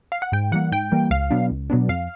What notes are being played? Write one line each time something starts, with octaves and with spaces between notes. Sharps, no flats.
F5
F#5
G#2 G5
E3 G3 A#3 F#5
G#2 G5
E3 G3 A#3
C#2 F5
B2 F#3 B3 D4
C#2
B2 F#3 B3 D4
F2 F5